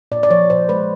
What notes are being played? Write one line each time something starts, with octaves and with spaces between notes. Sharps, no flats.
A#2 D5
D5
F3 C#5
A#2 C5
G#3 B4